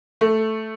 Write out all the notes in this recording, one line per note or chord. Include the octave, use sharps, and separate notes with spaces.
A3